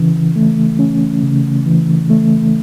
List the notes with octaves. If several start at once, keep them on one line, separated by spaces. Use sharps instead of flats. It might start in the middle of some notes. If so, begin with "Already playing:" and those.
Already playing: C#3 E3 C#4
A3
C#4
C#3
E3
A3